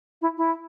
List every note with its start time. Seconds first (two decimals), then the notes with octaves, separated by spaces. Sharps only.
0.22 E4
0.37 E4